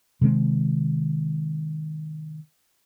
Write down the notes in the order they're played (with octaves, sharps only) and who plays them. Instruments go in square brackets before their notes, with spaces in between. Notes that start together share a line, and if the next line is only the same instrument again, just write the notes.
[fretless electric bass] C3 D#3 G#3 C4